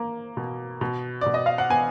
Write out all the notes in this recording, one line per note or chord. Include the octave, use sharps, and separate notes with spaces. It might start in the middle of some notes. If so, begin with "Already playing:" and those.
Already playing: A#3
B2
B2
B2 D5
D#5
F5
F#5
B3 G#5